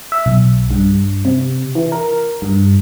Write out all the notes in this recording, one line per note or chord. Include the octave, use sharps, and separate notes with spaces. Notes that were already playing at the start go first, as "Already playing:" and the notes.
E5
B1
G2
C3
E3
A#4
G2